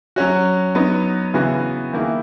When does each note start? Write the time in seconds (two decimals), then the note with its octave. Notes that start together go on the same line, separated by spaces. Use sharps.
0.16 F#3 C#4 F#4
0.75 F#3 B3 D#4
1.34 C#3 E3 B3 F#4
1.93 D#3 A#3 E4 G#4